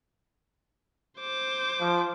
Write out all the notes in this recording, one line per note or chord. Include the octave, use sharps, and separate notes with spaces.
C5 D6
F3